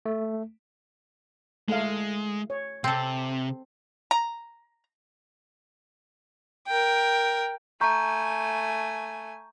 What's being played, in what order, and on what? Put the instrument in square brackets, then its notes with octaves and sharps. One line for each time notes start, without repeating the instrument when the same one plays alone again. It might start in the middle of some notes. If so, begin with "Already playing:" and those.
[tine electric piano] A3
[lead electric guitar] G#3 [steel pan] A3 F5
[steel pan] C#5
[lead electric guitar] C3 [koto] C4 A4
[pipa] A#5
[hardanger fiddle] A#4 G5
[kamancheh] A3 G#5 [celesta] A#5 C#6 G6